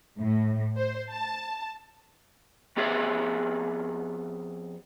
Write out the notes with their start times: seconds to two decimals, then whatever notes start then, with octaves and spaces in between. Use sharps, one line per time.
0.19 A2
0.77 C5
1.11 A5
2.77 F2 B3 G4 G#4 C#5 E5